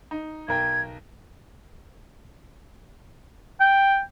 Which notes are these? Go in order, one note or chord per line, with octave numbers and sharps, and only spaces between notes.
D#4
B1 A#4 G5 G#6
G5